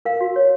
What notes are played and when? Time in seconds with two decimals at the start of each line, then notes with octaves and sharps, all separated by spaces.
0.05 A#4 F5
0.21 F#4
0.36 C#5